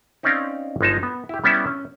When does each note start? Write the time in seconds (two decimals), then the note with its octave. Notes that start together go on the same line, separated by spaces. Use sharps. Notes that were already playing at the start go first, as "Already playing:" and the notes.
0.23 C4 C#4 D#4 C5 D5 F5
0.81 G1 G#3 D#4 A5
1.03 B3
1.29 E4 G4
1.44 G3 B3 C#4 E4 E5
1.67 C#4